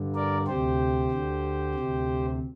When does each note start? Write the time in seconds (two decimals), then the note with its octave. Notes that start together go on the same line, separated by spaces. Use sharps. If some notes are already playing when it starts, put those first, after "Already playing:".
Already playing: G2 D3
0.15 A#4 D5
0.47 D2 C3 G4 C5
1.11 D2 D3
1.75 D2 C3